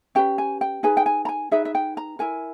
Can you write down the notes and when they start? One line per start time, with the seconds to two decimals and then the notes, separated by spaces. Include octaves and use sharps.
0.15 C#4 G4 B4 G5
0.38 G#5
0.61 G5
0.83 D#4 G#4 B4 G#5
0.97 G5
1.06 G#5
1.25 A#5
1.29 G#5
1.51 D#4 G#4 B4 E5
1.65 E5
1.75 G5
1.97 A#5
2.19 E4 A#4 G#5